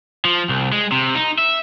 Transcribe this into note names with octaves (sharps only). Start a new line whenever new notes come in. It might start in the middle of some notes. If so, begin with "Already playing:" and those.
F3
C2
G#3
C3
D#4
E5